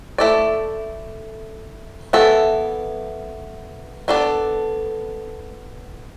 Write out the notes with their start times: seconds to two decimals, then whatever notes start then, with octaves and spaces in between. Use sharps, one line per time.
0.18 A3 E4 A4 D5
2.13 E3 B3 E4 A4
4.08 B3 D4 A4 D5